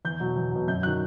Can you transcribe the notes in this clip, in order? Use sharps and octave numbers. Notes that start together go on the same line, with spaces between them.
E2 G6
B2 F#3
E2
B2 F#3
F#2 G6
D#3 F#3 F#6